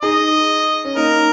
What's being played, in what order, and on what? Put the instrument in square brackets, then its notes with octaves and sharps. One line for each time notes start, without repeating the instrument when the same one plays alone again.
[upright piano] D#4 G#4 [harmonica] D#5
[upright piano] C#4
[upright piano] A#3 D#4 [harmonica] A#4